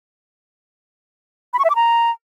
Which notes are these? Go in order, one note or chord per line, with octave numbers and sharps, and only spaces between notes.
B5
C#6
E5
D6
A#5